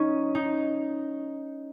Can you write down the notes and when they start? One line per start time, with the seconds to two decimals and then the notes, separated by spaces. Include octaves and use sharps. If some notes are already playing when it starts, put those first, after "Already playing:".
Already playing: C#4 D#4
0.35 D#4